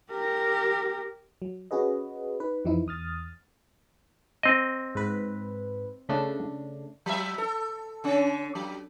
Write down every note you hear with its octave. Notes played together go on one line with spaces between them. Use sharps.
G4 A#4
F#3
C#4 F#4 G#4 B4 D#5
D#4 B4
F2 E3 F3 D#4 E4
E2 D#6 F6 A6
C4 D#5
G#2 B4
C#3 A3 D4
F#3 E5
A4
D3 C#4
F#3